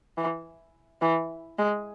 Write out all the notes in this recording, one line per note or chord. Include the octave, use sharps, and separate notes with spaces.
E3
E3
G#3